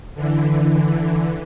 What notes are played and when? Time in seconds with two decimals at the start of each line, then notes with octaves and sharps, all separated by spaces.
0.14 D3 E3